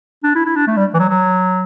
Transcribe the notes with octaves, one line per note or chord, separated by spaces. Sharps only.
D4
E4
E4
D4
A3
G3
E3
F#3
F#3